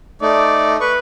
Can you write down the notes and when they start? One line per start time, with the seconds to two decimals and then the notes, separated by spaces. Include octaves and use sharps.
0.22 A3 D#4 D5
0.80 B4 C#6